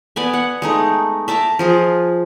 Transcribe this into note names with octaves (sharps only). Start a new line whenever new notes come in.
B3 D5 G#5
F#5
G#3 A3 D#4
E5 A5 A#5 D6
F3 F4 G#4